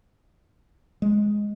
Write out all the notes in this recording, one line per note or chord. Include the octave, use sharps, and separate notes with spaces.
G#3